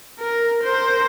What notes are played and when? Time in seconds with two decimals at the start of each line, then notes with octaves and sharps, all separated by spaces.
0.19 A#4
0.63 A#4 C5